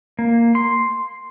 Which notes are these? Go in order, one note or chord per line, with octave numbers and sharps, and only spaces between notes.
A#3
C6